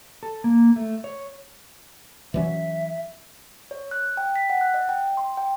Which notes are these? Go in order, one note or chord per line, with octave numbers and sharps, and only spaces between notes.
A4
A#3
A3
C#5
E3 F#3 C#4 E5
C#5
F#6
G5
B6
F#5
F#6
D#5
G5
C6
G5